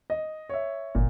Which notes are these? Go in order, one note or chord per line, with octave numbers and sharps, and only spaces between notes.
D#5
C#5 E5
G1 A#2